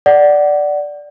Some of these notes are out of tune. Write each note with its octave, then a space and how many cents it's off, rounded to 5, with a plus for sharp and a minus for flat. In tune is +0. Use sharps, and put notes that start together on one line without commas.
D5 +0 F#5 +15